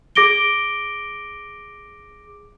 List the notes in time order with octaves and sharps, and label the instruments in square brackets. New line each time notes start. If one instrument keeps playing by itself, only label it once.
[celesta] G#4 D6 A#6 D7 G7